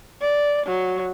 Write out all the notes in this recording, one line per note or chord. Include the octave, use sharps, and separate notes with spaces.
D5
F#3